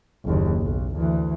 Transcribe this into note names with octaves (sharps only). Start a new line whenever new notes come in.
F#1 D#2
B1
D2 E3